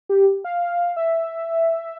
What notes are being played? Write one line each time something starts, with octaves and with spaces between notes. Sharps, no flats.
G4
F5
E5